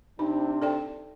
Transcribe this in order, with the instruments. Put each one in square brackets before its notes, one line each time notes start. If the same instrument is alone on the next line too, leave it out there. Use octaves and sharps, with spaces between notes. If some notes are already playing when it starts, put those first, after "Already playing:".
[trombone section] C3 C4 D4 [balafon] D#4
[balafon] A4 D5 G5